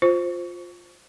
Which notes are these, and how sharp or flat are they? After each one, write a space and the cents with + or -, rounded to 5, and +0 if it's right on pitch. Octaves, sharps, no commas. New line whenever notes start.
F4 +15 C5 +0